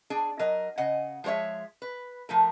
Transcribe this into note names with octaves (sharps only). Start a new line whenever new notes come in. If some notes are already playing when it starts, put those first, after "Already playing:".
D4 G#4
F#3 A#4 D#5
C#3 D#5 F#5 G#5
F3 G#3 C5 C#5 E5
B4
F3 A3 A#4